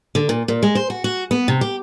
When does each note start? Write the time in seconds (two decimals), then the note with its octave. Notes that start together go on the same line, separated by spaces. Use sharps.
0.15 D3
0.29 A#2
0.48 A#2
0.63 G#3
0.75 C5
0.90 F#4
1.04 F#4
1.31 B3
1.48 C3
1.61 G4